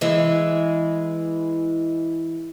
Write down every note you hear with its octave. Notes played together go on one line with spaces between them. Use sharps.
E3 G#3